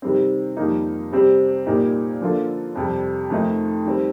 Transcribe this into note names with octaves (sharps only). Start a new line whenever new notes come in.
C3 D#3 G3 C4
F2 D#3 G3 A#3 D#4
C3 G3 C4 G4
A#2 G3 A#3 D#4 G4
D3 F3 A#3 F4 A4
F2 C3 G3
F2 D#3 A3 D#4
D#3 G3 C4